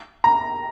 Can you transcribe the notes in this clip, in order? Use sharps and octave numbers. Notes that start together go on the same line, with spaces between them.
A#5